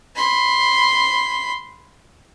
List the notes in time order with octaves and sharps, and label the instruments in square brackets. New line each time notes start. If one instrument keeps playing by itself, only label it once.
[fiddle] B5 C6